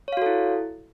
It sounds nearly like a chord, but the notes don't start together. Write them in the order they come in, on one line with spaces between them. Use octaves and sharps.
C#5 F5 F#4 A4 E4